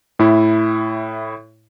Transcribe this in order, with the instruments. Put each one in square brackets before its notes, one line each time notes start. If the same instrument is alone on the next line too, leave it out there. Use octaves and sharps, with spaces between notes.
[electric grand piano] A2 E4